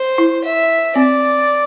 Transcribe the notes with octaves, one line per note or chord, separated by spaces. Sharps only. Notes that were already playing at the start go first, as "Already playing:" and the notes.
Already playing: C5
E4
E5
C4 D5